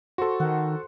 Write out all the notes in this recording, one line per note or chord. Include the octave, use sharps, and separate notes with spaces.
F#4 A4 C5 C#6
D#3 F#5